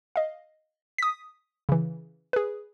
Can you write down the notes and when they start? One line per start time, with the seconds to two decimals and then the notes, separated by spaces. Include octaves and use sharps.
0.16 D#5 F5
0.98 D#6 B6
1.69 C#3 E3
2.33 G#4 B4